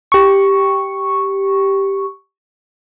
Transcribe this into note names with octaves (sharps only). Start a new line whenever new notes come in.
G4 C#6